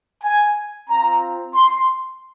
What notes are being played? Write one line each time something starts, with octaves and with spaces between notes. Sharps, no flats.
G#5
C4 F4 A#5
C6